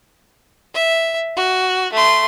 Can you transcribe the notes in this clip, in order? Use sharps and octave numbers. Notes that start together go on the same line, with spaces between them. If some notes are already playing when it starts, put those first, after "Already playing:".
E5
F#4
A3 C6